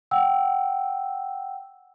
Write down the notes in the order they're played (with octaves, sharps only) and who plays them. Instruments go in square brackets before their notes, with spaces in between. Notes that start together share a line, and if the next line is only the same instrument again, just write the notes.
[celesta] F#5 G5 E6